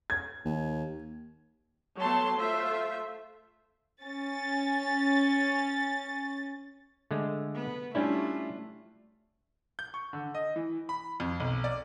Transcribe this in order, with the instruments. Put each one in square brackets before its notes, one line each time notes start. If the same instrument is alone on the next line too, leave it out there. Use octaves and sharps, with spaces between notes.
[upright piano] G#6
[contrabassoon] D#2
[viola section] F#3 A3 B3 C#5 A5 C6
A3 F4 C5 E5
[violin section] C#4 A6
[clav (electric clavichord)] D3 G#3 A3
[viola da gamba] B3
[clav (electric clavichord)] G3 C#4 E4 [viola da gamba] A3 F4 [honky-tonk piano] D4
[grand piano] G6
C#6
D3
D#5
E3
B5
F2
B1
D5